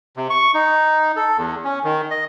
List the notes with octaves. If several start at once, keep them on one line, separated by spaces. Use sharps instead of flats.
C3
C#6
D#4
A4
E2
C#4
D#3
D#5